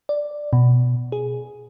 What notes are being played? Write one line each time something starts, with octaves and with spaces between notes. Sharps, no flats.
D5
B2
G#4